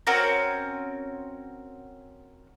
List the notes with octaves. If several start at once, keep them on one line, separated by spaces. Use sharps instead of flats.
C4 C#4 F#4 A#4